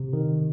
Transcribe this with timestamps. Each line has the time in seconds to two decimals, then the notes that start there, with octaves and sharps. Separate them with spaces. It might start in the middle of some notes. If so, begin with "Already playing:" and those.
Already playing: C3
0.13 D#3